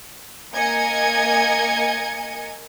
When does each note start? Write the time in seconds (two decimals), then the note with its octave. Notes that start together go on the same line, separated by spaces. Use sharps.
0.55 A#3 D#5 G#5 G#6 C#7